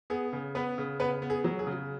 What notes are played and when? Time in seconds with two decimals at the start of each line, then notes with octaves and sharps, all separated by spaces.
0.10 B3 G#4
0.33 C#3
0.55 B3 B4
0.78 C#3
1.00 C#3 B3 B4
1.22 B3
1.30 G#4
1.44 F#3
1.59 G#4
1.67 C#3